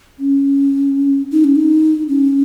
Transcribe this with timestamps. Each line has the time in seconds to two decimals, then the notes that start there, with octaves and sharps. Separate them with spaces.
0.19 C#4
1.32 D#4
1.44 C#4
1.55 D#4
2.08 C#4